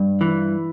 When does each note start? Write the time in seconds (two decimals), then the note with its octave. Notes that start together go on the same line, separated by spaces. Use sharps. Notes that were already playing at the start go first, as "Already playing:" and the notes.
Already playing: G2
0.21 E3